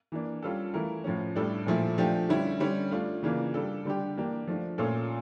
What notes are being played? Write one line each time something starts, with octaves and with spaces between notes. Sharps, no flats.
E3 A#3 D4
G3 C#4 F4 A4
E3 A3 E4 A#4
A2 F3 C#4
A2 G3 D4 A4
A#2 F3 A3 E4
F3 A3 D4 G4
D3 G3 C#4 E4
D3 G3 C#4
A3 D4 F4
C#3 E3 A#3 D4 F4
G3 D4 A4
D3 G3 D4 G4
E3 A#3 D4 G4
F3 A3 D4
A#2 A3 C#4 F4 A4